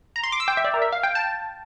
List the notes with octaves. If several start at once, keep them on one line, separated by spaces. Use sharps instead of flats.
A#5
C6
D6
E6
G5
E5
D5
A#4
E5
F5
G5
A5